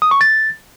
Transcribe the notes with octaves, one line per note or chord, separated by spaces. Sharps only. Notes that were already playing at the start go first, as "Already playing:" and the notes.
D#6
C#6
A6